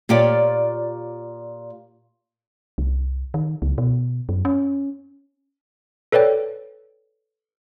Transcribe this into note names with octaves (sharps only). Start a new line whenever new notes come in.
A#2 F4 G4 C#5 D5
C2
D#3
C#2
B2
F#2
C#4
A4 B4 C#5 D5 G5